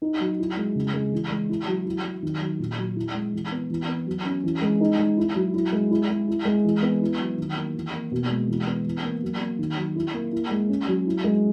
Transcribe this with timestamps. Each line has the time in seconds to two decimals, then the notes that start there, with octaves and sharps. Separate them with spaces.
0.02 D#4
0.21 F#3
0.39 E4
0.57 G#3
0.75 C#3
0.94 G#3
1.12 E3
1.30 G#3
1.49 E4
1.68 F#3
1.86 E4
2.04 F#3
2.23 D#3
2.41 F#3
2.59 A#2
2.78 F#3
2.96 E4
3.14 G#3
3.33 E3
3.52 B3
3.70 E3
3.88 B3
4.06 F#3
4.25 C#4
4.44 E3
4.62 G#3
4.81 D#4
4.99 G#3
5.17 E4
5.35 F#3
5.54 E4
5.72 G#3
5.91 E4
6.10 G#3
6.28 E4
6.45 G#3
6.64 E3
6.82 B3
7.01 E4
7.20 F#3
7.38 D#3
7.56 A#3
7.75 E3
7.93 A#3
8.11 B2
8.30 G#3
8.48 E3
8.67 B3
8.85 E3
9.04 A#3
9.22 F#3
9.41 A#3
9.59 D#3
9.77 F#3
9.96 E4
10.14 A#3
10.32 E4
10.51 G#3
10.69 C#4
10.88 F#3
11.06 E4
11.24 G#3